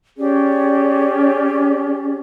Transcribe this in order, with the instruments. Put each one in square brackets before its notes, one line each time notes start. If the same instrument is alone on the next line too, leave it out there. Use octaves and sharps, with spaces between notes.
[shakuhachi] C#4 [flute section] G4 G#4 D5